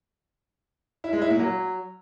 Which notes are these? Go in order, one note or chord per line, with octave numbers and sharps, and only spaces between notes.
E4
G#3
E4
A#2
F#3